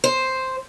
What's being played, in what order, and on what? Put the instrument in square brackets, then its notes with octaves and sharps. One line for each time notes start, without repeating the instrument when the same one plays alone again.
[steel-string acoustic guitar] C5